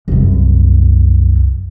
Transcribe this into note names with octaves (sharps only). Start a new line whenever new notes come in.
C2 F#2